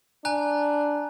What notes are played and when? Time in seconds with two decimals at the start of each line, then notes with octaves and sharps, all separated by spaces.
0.25 D4 G#5 A#5 F#6